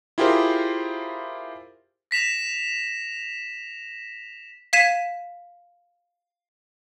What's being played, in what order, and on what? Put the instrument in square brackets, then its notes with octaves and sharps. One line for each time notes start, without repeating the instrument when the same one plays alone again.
[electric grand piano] E4 F4 G4 G#4 A#4 C5
[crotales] A#6 B6 E7 F7
[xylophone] F5 G#6 B6 D#7 E7